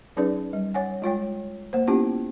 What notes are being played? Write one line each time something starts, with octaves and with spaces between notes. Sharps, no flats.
F#3 C#4 D#4 G#4 B4 D5
G3
C#5 F#5 G#5
G#3 F4 C#5 G5
A#3 C5
A#3 B3 C#4 E4 F4 G4